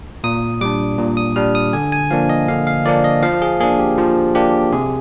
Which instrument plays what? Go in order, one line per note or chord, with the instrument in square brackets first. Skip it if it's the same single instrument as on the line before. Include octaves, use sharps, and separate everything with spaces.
[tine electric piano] A#2 D#6
G3 D4 D6
A#2
D#6
G3 D4 F6
D#6
D3 G#5
G#5
F3 A#3 D4 F5
D#5
D3 F5
F5
F3 A#3 D4 D5
D#5
F3 F5
G#4
A#3 D4 G#4
G4
F3 F4
A#3 D4 G4
C3 G#4